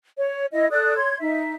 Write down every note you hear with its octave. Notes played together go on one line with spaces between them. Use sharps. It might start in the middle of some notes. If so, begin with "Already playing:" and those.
C#5
E4 D#5
A4 D5 D#6 F#6
C#5 C6 G#6
D#4 E5